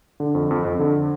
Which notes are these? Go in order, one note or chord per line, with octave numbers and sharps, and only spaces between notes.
D3
F2
F2
F2
D3